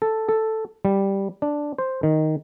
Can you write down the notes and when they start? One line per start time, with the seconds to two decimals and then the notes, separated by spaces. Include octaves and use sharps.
0.02 A4
0.29 A4
0.85 G3
1.42 D4
1.78 C5
2.03 D#3